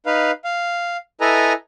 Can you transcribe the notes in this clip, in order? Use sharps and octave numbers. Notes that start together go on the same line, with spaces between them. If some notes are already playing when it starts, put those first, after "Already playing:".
D#4 B4 F5
F5
E4 A4 B4 D#5 G#5 A#5